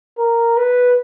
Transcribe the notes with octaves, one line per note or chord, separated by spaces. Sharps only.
A#4
B4